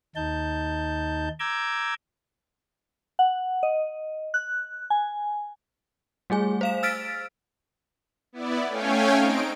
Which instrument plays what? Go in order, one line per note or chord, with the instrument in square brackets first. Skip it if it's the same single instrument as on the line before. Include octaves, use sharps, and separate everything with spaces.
[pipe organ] D#2 D#4 A5 G6
A#5 D6 E6 G6 G#6
[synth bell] F#5
D#5
F#6
G#5
G3 A3 G#4 G#5
C5 F5 E7
E6 F6 A6 B6 D7
[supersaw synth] B3 E4 D5
A3 C#4 C#5 F5 G5 G#5
C4 D#4 D7